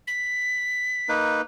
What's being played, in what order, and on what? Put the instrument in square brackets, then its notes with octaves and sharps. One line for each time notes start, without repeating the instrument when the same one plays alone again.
[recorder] B6
[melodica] A#3 D#4 B4